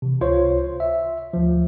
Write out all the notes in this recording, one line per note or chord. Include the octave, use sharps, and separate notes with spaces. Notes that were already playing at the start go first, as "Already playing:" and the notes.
C3 E3
C#2 F4 C5 C#5 C6
E5
D2 F3